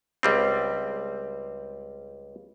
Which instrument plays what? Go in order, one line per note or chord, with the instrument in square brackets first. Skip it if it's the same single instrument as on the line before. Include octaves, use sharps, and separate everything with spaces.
[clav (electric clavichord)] C#2 G3 C4